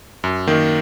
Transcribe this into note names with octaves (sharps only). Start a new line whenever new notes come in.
F#2
D#3 A#3